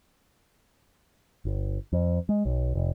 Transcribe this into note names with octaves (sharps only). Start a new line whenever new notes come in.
G1
F2
G#3
B1
F1